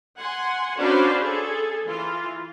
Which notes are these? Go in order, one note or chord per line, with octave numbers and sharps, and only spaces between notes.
F#5 G#5 C6
C#4 D4 F#4 B4 C5 F5
G#4 A4
E3 F4